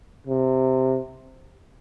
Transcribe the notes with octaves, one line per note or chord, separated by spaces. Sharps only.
C3